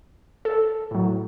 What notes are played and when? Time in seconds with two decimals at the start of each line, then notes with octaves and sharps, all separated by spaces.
0.45 A4
0.91 A2 F#3